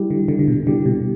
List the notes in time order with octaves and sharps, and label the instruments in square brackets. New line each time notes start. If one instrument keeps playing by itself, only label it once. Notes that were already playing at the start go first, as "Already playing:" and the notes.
Already playing: [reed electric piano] G3 E4 G4
[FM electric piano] D3
D3
D3
B2
[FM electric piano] D3 [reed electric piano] G3 E4 G4
[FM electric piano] B2